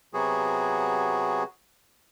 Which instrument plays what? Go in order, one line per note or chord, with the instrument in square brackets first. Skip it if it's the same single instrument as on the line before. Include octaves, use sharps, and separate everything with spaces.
[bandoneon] C3 F#3 B3 F#4 G#4